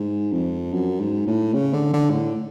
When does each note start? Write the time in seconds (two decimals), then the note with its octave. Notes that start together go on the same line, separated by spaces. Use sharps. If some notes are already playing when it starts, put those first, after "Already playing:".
Already playing: G#2
0.33 F2
0.73 F#2
1.00 G#2
1.27 A2
1.54 C#3
1.73 D3
1.94 D3
2.10 G#2
2.13 A2